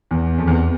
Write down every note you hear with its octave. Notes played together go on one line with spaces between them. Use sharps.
E2
F2
E2